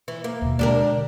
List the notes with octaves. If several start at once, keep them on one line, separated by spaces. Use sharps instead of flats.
E3
A#3
D#2 B2
B2 D3 G#3 D4 G4 A#4